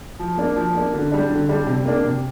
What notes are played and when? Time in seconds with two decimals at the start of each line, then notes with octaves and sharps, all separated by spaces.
0.19 F3
0.37 A#3 D4
0.56 F3
0.74 A#3 D4
0.93 D3
1.12 G3 D4
1.30 D3
1.49 G3 D4
1.67 C3
1.85 A#3 D4
2.04 C3